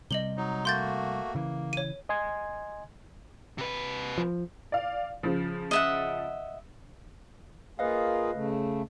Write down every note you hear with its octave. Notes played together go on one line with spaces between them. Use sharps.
C3 G3 D#5 F#7 G7
F#3 D#4
A3 A#3 F#4 C6 G6 A6
C#3 E3 A#3
C#5 D#7
D#5 G#5 C6 G#6
C3 B4
F3
D5 F5
C#3 F3
D#5 E5 F#5
A#3 F4 G#4 B4 D#5 F5
C#3 A3